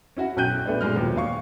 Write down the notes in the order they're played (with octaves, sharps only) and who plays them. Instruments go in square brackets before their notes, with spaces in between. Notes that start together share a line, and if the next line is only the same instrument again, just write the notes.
[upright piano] C#4 E4 F#4 F#5
B1 F#2 G5 F#6 G6 D#7
A#2 A3 B3 D4
A#2 F#3 G#3 F6
D#2 B2 F3
A#2 F5 C#6